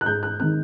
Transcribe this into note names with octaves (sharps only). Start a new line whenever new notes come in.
F#6
G#2 G6
F#6
D#3 G#3 C4 F#6